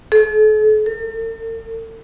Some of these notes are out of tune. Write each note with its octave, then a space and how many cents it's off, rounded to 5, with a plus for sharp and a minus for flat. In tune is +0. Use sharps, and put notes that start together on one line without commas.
A4 -45
A4 +45